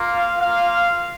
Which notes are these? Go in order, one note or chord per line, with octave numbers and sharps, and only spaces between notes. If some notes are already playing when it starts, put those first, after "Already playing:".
Already playing: A#3 F4
F5
A#3 F4 F5